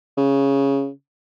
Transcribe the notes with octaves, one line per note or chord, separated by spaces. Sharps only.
C#3